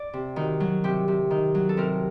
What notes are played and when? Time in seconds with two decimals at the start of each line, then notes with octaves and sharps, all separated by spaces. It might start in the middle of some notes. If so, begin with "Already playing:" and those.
Already playing: D5
0.14 C3
0.36 D#3 F#4
0.60 F#3
0.84 C3 G4
1.08 C3
1.31 D#3
1.55 F#3
1.69 A4
1.77 C3 A#4